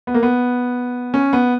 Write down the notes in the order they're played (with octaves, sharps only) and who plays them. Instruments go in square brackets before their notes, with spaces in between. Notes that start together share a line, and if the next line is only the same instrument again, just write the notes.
[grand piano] B3
A#3
B3
C#4
B3